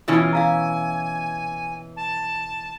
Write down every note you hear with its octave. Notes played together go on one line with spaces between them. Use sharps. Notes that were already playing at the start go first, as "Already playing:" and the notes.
B2 E3 C#4 F4
E4 F5 G#5 E6
A5